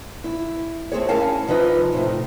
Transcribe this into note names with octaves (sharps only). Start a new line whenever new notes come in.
E4
A3 C4 G#4 C#5
C#4 E4 A#4 F5 G#5 A5
C3 F3 D#4 B4 D#5
A2 C3